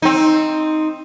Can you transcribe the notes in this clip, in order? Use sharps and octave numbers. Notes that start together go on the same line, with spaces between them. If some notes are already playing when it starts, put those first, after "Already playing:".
C4 D#4